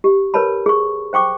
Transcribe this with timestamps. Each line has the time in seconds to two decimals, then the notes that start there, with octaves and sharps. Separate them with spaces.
0.04 G4
0.34 A#4 B4 C#5 A5 B5
0.66 G#4 C#6
1.13 C5 G5 C#6 D6